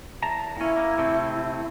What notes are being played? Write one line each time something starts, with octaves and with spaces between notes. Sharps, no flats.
E2 A5 A#5
A#2 C#4 E4
A#3
C3 A3 C4